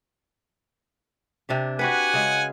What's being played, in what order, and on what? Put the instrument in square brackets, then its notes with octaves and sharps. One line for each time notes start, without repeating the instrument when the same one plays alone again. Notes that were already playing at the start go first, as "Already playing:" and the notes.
[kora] C3 D4 G4
[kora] F#4 G4 B4 [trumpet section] F#5 G#5
[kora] C#3 G#3